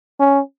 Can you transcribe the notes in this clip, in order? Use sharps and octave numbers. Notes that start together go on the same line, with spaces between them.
C#4